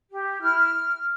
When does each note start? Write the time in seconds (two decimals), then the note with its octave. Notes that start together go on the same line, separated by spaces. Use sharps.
0.11 G4
0.41 E4 F6